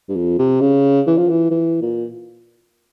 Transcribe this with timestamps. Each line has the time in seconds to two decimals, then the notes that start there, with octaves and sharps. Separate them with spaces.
0.09 G2
0.16 F2
0.39 C3
0.61 C#3
1.07 E3
1.17 F3
1.29 E3
1.51 E3
1.82 A#2